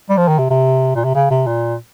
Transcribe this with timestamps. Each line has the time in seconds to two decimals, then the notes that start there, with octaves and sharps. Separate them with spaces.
0.10 G3
0.17 F3
0.28 D#3
0.39 C3
0.50 C3
0.95 A#2
1.05 C3
1.15 C#3
1.31 C3
1.47 A#2